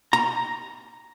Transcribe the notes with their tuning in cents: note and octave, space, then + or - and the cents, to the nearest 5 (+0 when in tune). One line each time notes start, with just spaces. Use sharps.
A#5 +0